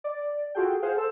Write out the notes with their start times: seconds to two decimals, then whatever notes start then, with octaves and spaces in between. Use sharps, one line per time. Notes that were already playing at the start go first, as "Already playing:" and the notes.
0.04 D5
0.55 F4 F#4 G#4 A4 G5
0.82 G#4 C5 F5 F#5
0.96 A4 C5 E6